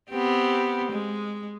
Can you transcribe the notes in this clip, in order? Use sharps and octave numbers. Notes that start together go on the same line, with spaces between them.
B3 C4 G4
G#3